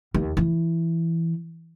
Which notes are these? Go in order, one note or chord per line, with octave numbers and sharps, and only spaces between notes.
D#2
E3